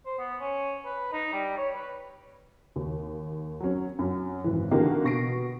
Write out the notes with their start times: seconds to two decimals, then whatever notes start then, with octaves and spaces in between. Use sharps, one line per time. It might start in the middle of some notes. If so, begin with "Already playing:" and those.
0.06 C5
0.19 B3
0.41 C#4
0.86 B4
1.13 D#4
1.33 G3
1.58 C#5
1.75 B4
2.76 D#2
3.60 F#3 C#4
3.99 F#2
4.44 G#1 E3
4.71 D3 E3 A#3 D#4 F#4 G4
5.04 B2 C#6 A#6 C7 D7